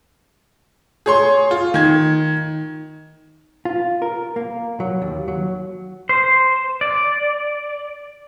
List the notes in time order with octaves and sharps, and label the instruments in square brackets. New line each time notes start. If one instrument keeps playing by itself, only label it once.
[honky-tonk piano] G#4 C#5 C6
F4
D#3 G#6
[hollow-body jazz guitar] F4
A#4
A#3
F#3
D#2
F#3
[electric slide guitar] C5
D5